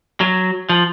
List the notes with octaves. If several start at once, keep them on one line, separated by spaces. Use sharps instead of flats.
F#3
F3